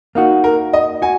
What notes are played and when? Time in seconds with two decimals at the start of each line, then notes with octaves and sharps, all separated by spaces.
0.15 A#3 D#4 F#4
0.44 A#4
0.73 D#5
1.02 F#4 G#5